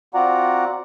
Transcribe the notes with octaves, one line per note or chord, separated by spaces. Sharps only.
C4 F4 F#4 D5 F#5 A#5